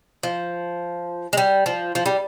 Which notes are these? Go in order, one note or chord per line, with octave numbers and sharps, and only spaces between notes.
F3
G#3
G3
F3
F3
G3